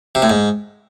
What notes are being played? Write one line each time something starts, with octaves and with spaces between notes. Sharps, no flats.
C3
A2
G#2